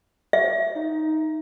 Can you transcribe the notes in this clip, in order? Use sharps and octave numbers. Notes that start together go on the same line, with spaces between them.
E5
D#4